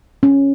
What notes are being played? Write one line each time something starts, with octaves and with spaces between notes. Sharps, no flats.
C#4